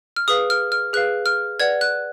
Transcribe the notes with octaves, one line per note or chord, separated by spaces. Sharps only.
F6
G#4 B4 F5 D#6
F6
F6
G#4 B4 F5 F#6
F6
B4 D5 F#5 G#6
F#6